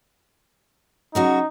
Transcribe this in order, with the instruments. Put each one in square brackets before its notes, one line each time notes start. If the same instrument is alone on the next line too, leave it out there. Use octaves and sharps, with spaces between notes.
[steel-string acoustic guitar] C#3 F#3 F#4 [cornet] D#4